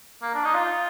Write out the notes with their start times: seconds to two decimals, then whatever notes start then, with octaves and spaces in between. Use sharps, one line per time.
0.22 A#3
0.34 D4
0.45 D#4
0.54 F4